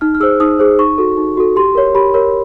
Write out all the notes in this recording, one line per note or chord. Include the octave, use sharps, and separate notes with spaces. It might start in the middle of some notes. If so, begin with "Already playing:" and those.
D#4 F6
F6
G#4 C5 E6
D#4 D#6
G#4 C5
D#4 C#6
F#4 A4
D#4
F#4 A4
G4 C6
A#4 C#5
G4 B5
A#4 C#5